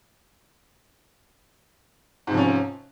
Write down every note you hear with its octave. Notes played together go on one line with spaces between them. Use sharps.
G#2 C3 F3 C#4